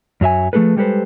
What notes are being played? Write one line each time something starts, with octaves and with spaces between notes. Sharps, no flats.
F#2 F#3 E5 G#5
F3 A3 A#3 G#4 A4 B4
G3 G#3 G4 A4 B4 C5